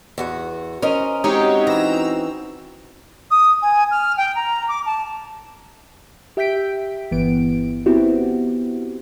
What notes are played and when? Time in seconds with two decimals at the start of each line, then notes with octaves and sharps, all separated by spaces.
0.18 E2 F#4 F#5
0.82 C#4 A#4 C5 D#5
1.24 G#3 C4 D#4 F#4 G4 C#5
1.67 E3 A#5 E6
3.31 D#6
3.62 G#5
3.91 F6
4.17 G5
4.35 A#5
4.68 D6
4.86 A5
6.37 G4 E5 G5 G6 B6 D7
7.11 G1 E3 B3 D7
7.86 B3 C4 E4 F#4 G4